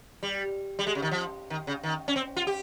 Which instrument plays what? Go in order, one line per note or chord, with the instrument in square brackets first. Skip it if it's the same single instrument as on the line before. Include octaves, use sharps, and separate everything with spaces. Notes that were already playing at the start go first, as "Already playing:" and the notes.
[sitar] G3
G3
G#3
C#3
D#3
F3
D#3
C#3
D#3
C#4
C4
F4
G4